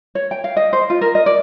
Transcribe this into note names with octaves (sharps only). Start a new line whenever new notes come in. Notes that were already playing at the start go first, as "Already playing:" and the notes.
C#5
G5
F5
D#5
C5
F4
A#4
D#5
D5